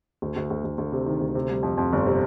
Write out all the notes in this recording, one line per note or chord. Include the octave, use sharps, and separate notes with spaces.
D2
D2
D2
D2
D2
C3
D#3
D2
C3
G3
F2
F2
G1
C3